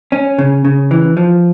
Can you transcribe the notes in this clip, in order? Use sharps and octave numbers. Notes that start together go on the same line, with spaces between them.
C#4
C#3
C#3
E3
F3